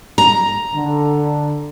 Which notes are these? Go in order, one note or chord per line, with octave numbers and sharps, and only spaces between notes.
A#5
D3